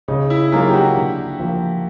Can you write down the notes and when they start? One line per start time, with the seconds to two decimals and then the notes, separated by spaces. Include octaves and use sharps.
0.08 C#3 D#4
0.30 E4
0.52 F#3 A#3 D#4 F4 G#4
0.67 G4
0.74 F#4
0.96 D3
1.39 F3 A#3